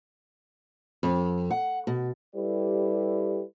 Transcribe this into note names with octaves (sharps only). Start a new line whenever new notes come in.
F2
F#5
B2
G3 E4 G4 A4 B4 D5